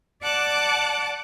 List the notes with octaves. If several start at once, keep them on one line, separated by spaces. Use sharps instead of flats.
D5 F#5 A5 D6 F#6